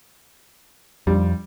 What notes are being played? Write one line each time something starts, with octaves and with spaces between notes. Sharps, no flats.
F2 G3